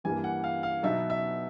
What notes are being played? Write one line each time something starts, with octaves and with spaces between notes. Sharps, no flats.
G2 E3 G3 A#3 G#5
F#5
F5
F5
B2 F#3 B3 D#4 E5
E5